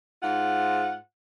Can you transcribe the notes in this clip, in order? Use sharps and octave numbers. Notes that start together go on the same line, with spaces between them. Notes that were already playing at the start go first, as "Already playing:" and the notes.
G#2 F4 F#5